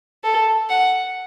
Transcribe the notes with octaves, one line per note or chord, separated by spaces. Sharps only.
A4
F#5